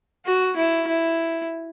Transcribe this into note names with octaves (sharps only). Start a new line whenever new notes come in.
F#4
E4
E4